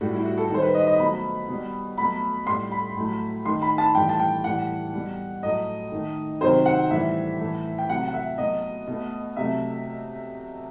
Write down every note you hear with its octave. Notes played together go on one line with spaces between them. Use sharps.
A2 G3 F#4
E4
F#4
A4
D#3 G3 C5
B4
D#5
D#5
B2 F#3 A3 B5
B2 G3
B2 F#3 A3 B5
A2 G3 C6
B5
A2 F#3 A3
D#3 A3 C6
B5
A5
A2 E3 G3 G5
A5
G5
A2 E3 G3 F#5
B2 G3
A2 F#3 A3 D#5
D#3 A3
C3 D#3 F#3 C5
F#5
A2 E3 G3 E5
A2 E3 A3
G5
C3 F#3 A3 F#5
F#5
E5
B2 F#3 A3 D#5
B2 A3
C3 F#3 A3 E5